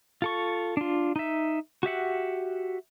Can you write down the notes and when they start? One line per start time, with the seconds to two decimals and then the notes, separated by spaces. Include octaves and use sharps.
0.22 F4 A4 C#6
0.77 D4 F4
1.16 D#4 E5
1.83 F#4 G4 E5 F#5